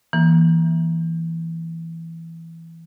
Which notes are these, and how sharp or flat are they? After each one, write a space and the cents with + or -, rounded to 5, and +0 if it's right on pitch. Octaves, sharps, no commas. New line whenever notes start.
E3 +0 A#3 +20